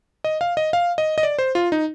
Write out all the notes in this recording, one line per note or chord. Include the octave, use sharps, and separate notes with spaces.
D#5
F5
D#5
F5
D#5
D#5
D5
C5
F4
D#4